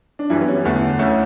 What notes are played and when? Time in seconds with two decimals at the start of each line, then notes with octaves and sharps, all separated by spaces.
0.19 D4
0.30 F#2 E3 G3 E4
0.42 B3
0.48 C#4
0.64 E2 D3 A3 B3
0.99 D2 D3 A3 C#4 E4